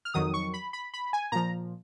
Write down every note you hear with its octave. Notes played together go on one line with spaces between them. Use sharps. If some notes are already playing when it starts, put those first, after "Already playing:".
F6
F2 D#3 F#3 D#6
C#6
B5
B5
B5
G#5
A#2 F3 A#5